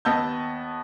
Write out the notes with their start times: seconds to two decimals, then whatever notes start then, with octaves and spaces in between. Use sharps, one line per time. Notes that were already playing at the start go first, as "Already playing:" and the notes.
0.05 D#2 B3 D#5 A5 E6 G6